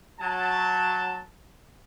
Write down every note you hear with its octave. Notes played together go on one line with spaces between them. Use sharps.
F#3 A5